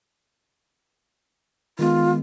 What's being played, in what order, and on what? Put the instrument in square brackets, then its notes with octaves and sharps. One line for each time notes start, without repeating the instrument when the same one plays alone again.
[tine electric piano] D#3 G#3 B3 [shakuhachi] F4